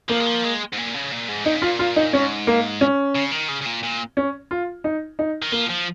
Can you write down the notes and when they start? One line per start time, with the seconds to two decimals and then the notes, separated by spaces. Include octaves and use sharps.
0.09 F3 A#3
0.20 G#3
0.26 F3
0.44 G#3
0.73 G#2
0.77 A#2
0.94 C#3
1.12 A#2
1.28 G#2
1.45 A#2 D#4
1.56 C#3
1.62 F4
1.67 A#2
1.79 F4
1.96 D#4
2.13 G#2 C#4
2.47 A#3
2.81 C#4
3.15 C#3
3.31 D#3
3.48 C#3
3.61 C#3
3.66 A#2
3.83 A#2
4.17 C#4
4.51 F4
4.84 D#4
5.19 D#4
5.42 D#3
5.52 F3 A#3
5.70 F3